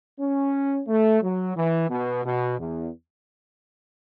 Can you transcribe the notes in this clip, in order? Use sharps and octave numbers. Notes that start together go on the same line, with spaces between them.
C#4
A3
F#3
E3
B2
B2
E2